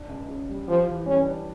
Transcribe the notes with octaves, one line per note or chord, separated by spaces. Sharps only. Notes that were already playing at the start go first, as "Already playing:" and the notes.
Already playing: D4
C#2
C#3
G3
F3 G4
E3
G3 C#4
D4